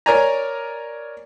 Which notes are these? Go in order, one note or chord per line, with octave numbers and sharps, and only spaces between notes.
A#4 C#5 D5 G#5 A#5